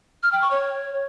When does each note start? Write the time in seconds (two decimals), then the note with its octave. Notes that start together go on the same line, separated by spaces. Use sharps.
0.23 F6
0.32 G5
0.42 C#6
0.51 C#5